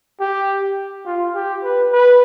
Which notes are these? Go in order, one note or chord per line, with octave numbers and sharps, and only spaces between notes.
G4
F4
G4
B4
B4